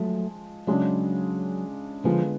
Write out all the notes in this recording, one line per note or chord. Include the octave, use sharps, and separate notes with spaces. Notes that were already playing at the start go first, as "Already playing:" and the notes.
Already playing: F3 F#3 G#3 A3
C#3 F#3 G#3 D4 G#4
D3 F3 G#3 B3 F4 G#4